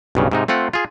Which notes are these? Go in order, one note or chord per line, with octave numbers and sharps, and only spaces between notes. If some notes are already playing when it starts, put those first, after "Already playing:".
B1 G2 C#3
G#2 C3 D#4
A3 C4 F4 F#5
F4 G#4